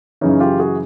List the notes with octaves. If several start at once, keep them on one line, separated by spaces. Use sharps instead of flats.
F#2 C#3 E3 C#4 D#4
F4 G4
F#4 G#4